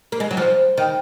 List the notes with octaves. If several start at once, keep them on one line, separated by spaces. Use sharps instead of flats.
A#3
G#3
F#3
F3
D#3